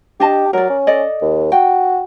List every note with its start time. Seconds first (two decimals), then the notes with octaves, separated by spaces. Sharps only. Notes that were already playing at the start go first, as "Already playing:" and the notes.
0.20 D4 G4 D#5 A5
0.53 F#3 A#4 D5
0.70 C#4
0.87 A4 D5 D#5
1.22 D#2
1.52 F#4 G5